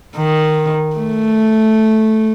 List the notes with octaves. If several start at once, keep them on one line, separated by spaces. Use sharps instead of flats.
D#3
A3